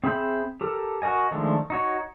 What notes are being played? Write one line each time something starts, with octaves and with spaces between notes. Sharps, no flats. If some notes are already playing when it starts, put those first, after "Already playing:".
C4 G#4 E5 B5 G6
G4 A4 A#4
F#4 A#4 D#5 G#5
D#3 F3 G#3 A3 D4
D#4 F#4 C#5